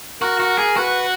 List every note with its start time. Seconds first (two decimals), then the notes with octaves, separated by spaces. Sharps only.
0.21 F#4 A#4
0.40 F#4
0.58 G#4
0.77 F#4 B4